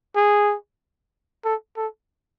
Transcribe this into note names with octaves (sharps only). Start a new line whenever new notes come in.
G#4
A4
A4